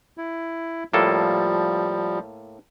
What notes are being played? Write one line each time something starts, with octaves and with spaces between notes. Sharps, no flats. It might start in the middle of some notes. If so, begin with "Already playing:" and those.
E4
A2 F3 G3 A#3 A4